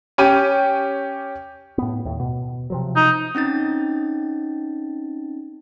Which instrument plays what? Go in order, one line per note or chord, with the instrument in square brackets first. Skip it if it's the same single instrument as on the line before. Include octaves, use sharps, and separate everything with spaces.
[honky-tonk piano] C#4 G4 D#7
[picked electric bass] A2 B3
D#2 A2
B2
C3 F3 F#3
[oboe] D#4
[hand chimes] C4 C#4 D#4 A6